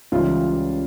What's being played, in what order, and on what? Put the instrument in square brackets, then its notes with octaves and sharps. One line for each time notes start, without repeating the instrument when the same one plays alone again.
[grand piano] C#2 C#3 E3 G3 F4